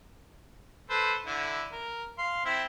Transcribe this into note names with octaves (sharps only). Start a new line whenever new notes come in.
A4 B4 C5
D3 E4
A#4
F5 C6
C4 E4 E5